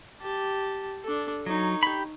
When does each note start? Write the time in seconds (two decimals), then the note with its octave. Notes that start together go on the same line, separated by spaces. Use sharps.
0.21 G4 A5
1.04 D4 A4
1.46 F#3 D#4 C#5
1.83 G4 B5